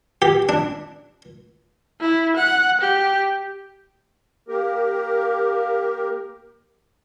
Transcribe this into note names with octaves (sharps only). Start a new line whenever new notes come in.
G4
D4
E4
F#5
G4
A#3 G4 A#4